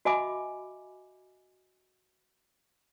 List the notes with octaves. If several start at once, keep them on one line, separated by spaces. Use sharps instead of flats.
F#4 D#5 E5 G#5 B5 D6